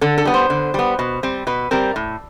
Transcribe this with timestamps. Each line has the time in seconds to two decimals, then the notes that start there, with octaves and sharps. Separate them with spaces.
0.01 D3 A4
0.18 A4
0.25 G3 B3
0.34 C5
0.50 D3
0.74 G3 B3
0.99 B2
1.23 G3 C4
1.47 B2 B4
1.71 G3 C4 A#4
1.96 A2